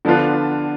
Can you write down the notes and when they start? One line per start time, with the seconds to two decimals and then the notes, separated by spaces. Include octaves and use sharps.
0.05 D3 F3 B3 D4 F4